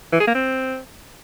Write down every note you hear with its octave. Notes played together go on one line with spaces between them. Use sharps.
E3
G#4
A#3
C4